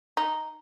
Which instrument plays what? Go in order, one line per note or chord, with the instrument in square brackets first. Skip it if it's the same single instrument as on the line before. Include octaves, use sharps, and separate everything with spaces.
[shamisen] D#4